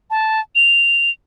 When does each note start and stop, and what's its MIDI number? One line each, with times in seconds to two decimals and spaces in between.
0.10 0.40 81
0.55 1.10 101